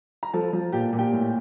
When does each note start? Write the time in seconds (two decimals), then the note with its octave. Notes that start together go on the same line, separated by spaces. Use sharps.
0.23 A#5
0.33 F3 A4 A5
0.53 F3
0.72 A#2 G4 G5
0.93 A#2
0.99 G4 G5
1.13 A2